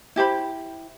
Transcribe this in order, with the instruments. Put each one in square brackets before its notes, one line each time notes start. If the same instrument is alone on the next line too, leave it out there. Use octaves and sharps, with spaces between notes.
[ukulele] E4 G4 C5 B5